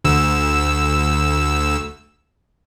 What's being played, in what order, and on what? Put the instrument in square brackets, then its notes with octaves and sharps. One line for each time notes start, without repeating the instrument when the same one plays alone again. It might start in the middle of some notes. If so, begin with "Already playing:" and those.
[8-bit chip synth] D2 E6